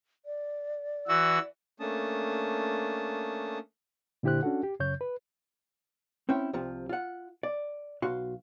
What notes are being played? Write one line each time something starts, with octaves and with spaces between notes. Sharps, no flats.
D5
E3 F#4 E6
A3 A#3 C#4 D4 A5 D#6
A#2 D3 E4 G4 C5 F#6
C#4 D4 F#4 A4 F#5
G4
F#2 C#3 C#5 G6
B4
C4 C#4 E4 G5
C2 C3 F3
F4 F#5
D5
B1 F#4 F5 C6